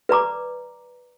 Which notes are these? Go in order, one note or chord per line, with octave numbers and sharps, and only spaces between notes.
B4 D5 A#5 D6